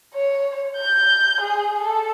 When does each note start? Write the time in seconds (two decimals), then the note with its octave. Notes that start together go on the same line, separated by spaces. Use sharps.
0.14 C#5
0.77 G6
1.41 G#4
1.82 A4